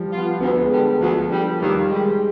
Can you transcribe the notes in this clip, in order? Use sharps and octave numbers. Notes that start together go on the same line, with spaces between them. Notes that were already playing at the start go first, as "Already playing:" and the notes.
Already playing: F3 G3
B3 F4
D2 B3
G#3
D3 G3
D2 F3
D3 G3
D#2 G3
D#3 G3 G#3